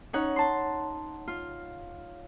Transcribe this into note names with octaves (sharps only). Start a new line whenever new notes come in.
C#4 D#4 C#5 F#5
A5 C6
F4